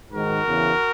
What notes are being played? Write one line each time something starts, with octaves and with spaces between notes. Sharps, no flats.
G#2 D#3 F#4 A#4
E2 C#3 E3